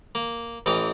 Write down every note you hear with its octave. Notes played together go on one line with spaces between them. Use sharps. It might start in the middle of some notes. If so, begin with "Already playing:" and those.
A#3
A1 E3 D#5 G5 A#5 D6